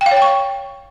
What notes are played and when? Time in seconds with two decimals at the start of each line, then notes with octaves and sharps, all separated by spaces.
0.01 G5
0.06 F5
0.11 C#5
0.17 G5
0.22 C#6